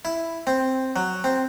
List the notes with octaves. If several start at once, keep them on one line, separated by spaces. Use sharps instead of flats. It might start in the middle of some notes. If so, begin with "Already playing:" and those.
E4
C4
F#3
C4